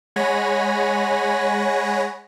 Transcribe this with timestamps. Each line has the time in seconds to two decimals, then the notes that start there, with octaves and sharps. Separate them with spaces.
0.16 G#3 C#5 F#5 G#5 B5 A#6